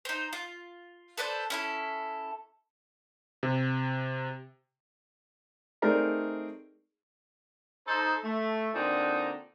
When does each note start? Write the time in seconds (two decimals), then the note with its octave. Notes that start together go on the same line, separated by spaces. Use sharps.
0.05 D#4 C5
0.33 F4
1.17 A4 B4 C5 D5
1.50 C#4 E4 A4
3.43 C3
5.82 A3 C4 D#4 G#4 A#4 D5
7.87 D#4 A4 C5
8.24 A3
8.75 A#2 D3 C4 D4 D#4